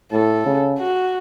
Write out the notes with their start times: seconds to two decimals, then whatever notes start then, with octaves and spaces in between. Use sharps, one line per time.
0.12 A2 A4
0.46 C#3
0.79 F#4